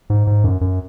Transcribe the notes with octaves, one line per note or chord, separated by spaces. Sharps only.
G#2
G#2
F#2
F#2